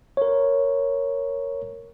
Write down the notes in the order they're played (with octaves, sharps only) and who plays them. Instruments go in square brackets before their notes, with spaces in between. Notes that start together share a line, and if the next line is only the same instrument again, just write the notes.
[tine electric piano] A#4 C#5